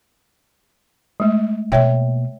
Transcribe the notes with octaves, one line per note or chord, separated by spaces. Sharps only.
G#3 A3
B2 A#3 C#5 E5 G5